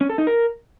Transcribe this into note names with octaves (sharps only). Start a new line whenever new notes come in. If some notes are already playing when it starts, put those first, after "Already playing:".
C#4
A4
D#4
A#4